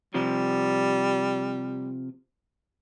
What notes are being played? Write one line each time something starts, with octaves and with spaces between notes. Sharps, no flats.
C3 F3 G3